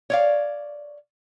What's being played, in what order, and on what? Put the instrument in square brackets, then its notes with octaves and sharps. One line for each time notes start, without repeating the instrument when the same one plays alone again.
[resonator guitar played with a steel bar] C#5 D5 F5